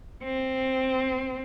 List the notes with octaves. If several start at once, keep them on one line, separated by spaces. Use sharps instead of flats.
C4